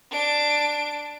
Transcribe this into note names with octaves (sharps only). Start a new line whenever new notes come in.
D4 D7